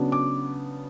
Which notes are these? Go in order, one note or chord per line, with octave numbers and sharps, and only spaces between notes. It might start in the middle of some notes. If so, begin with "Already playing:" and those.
Already playing: C#3 F#3 B3 D4
D6